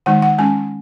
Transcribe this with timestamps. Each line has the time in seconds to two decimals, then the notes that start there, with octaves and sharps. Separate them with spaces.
0.06 D#3 G#3 D#4 F#5
0.22 F#5
0.38 G#3 C#4 G#5